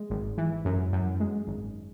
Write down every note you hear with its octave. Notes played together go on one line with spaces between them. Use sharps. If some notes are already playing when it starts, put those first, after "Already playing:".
Already playing: G#3
G#1
E3
F#2
F#2
G#3
G#1